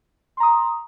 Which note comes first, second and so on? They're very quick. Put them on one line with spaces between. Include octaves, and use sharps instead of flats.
C6 A#5 D#6